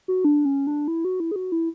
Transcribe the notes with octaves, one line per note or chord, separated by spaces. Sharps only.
F#4
D4
C#4
D4
E4
F#4
E4
G#4
F#4
E4